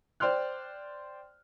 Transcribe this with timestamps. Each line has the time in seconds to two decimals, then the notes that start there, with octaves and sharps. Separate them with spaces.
0.20 C5 D5 G5 C6 F6 F#6